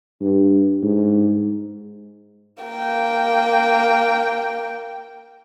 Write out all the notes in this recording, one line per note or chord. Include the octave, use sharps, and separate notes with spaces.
G2
G#2
A#3 G5